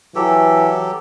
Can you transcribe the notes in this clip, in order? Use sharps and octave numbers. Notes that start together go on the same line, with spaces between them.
E3 F#3 G4 A4